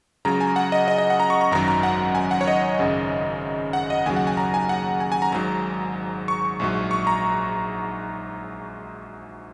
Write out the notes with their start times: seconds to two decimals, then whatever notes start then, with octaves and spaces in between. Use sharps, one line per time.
0.25 C#2 C#3 F#3 A#5
0.40 G#5
0.56 F#5
0.72 D#5
0.88 D#5
0.98 D#5
1.10 F#5
1.20 A#5
1.30 C#6
1.41 A#5
1.51 G#1 F#2 D#3 F#3 A#5
1.68 A#5
1.83 F#5
2.15 G#5
2.31 F#5
2.41 C#5
2.48 D#5
2.79 G#1 F#2 C#3
3.73 F#5
3.90 D#5
4.06 D#2 C#3 F#3 G#5
4.16 F#5
4.27 G#5
4.37 A#5
4.54 G#5
4.69 F#5
5.00 G#5
5.12 G#5
5.22 A#5
5.32 G#1 G#2 F#3 A#5
6.28 C#6
6.60 A#1 G#2 F#3
6.91 C#6
7.07 A#5